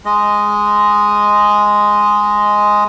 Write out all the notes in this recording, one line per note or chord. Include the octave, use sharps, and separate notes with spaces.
G#3 D#5